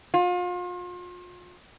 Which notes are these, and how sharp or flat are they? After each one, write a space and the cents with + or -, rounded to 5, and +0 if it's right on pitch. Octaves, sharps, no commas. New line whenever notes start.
F4 +35